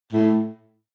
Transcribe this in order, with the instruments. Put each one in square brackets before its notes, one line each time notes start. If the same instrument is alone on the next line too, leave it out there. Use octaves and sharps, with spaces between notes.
[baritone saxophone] A2